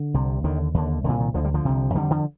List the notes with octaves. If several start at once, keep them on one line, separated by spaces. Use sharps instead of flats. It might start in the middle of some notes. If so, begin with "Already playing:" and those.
Already playing: D3
C2 C3
D#2 D3 D#3
D#2 D3
C2 A#2 D3
D#3
D2 D3 F3
G3
D3 F3
C2 C3
F2 D3 D#3 G3
D3 F3